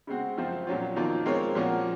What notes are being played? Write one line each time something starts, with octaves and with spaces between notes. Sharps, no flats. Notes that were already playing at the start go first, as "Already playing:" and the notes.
C#3 G#3 C4 F#4
F#2 F3 C4 F4 C5
A#2 F#3 C#4 F4
F2 D#3 A#3 F4
G#3 C4 F4 A#4 C#5
A#2 F3 A#3 C#4 F#4